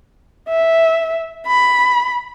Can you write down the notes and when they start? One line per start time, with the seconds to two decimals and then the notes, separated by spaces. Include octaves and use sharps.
0.49 E5
1.47 B5